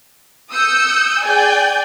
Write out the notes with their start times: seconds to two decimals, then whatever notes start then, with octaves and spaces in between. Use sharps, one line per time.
0.51 D#6 E6 G6 C#7
1.24 G#4 D5 G5 G#5 G6